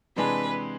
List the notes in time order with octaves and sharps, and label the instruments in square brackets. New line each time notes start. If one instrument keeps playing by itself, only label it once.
[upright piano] C3 E3 G#3 D4 G#4 [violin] B4